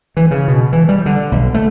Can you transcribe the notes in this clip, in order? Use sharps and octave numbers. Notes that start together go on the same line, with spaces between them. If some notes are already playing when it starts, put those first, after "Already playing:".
E3
C#3
B2
E3
G3
D3
B1
A3